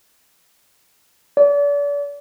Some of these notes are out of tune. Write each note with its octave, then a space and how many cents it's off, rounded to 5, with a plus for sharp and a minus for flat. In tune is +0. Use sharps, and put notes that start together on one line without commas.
D5 -40